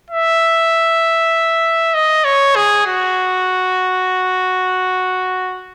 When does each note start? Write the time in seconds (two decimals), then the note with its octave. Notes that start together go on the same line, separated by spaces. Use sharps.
0.10 E5
1.94 D#5
2.25 C#5
2.56 G#4
2.86 F#4